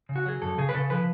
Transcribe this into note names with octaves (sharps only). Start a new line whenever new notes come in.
C#3
F#4
F#3 G#4
F#2 A4
C#3 G#4
B4
C#3 A4
F3 B4